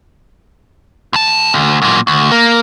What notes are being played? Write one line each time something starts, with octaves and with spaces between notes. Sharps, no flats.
D2 A5
D2
F#2 A#2
D2
A#3